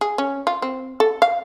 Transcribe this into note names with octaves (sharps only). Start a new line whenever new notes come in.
G#4
C#4
F4
C4
A4
F5